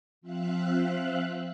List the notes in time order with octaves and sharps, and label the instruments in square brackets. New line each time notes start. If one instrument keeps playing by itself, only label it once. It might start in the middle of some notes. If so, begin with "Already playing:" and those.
[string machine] F3 C4 E5 F5 F#6